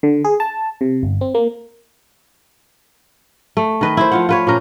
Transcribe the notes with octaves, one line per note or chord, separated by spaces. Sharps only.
D3
G#4
A5
C3
G1
C4
A#3
A3
D#3 B4 D#5
E4 C5
F3 F4 F#5
F4 B4 C#5
A#2 C#4 A#4